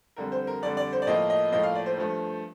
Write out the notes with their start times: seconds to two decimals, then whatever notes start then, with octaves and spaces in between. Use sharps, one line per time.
0.16 F2 D3 G3 A#4
0.32 C5
0.47 A#4
0.62 F2 D3 G3 D5
0.77 D5
0.93 C5
1.02 D5
1.07 A2 F3 A#3 D#5
1.30 D#5
1.52 A2 F3 A#3 D#5
1.63 F5
1.75 D5
1.86 C5
1.97 G2 F3 A3